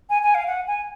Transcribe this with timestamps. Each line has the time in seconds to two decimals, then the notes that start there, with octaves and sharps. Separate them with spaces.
0.09 G#5
0.22 G#5
0.34 F5
0.47 F#5
0.67 G#5